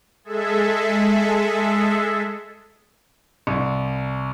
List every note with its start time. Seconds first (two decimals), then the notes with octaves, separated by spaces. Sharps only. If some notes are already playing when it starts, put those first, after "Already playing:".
0.24 G#3 G#4 A4 E5
3.47 C2